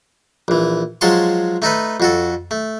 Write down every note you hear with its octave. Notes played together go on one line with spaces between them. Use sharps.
A#1 E3
F3 F#3 G#3 A5 C6 C#6
A3 D#4 A4 B4
F2 F#4 A4
A3